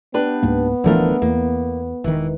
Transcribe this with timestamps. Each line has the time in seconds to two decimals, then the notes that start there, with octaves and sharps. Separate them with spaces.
0.14 B3 D4 G4 B4
0.43 C#2 G#2 A#3
0.84 D1 D3 E3 F3 A3 A#4
1.22 E2 A#3
2.04 E1 D#3 E3